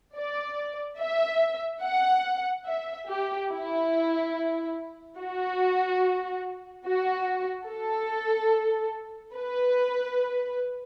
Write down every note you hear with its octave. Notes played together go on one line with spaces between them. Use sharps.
D5
E5
F#5
E5
G4
E4
F#4
F#4
A4
B4